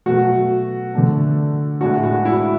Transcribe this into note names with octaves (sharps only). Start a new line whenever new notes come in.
B2 F#3 A3 F#4
D3 A3 D4
A2 G#3 D4 F#4
F#4
E4